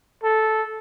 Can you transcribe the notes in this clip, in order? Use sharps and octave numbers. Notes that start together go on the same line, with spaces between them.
A4